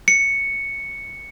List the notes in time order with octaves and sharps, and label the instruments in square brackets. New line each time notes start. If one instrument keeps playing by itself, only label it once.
[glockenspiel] C#7